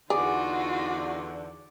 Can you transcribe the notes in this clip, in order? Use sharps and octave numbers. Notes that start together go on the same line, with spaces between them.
E2 D3 D#4 F4 F#4 G#4 D5